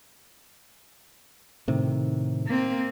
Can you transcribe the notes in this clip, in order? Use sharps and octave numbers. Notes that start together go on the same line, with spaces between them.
A2 C3 D#3
A#3 C4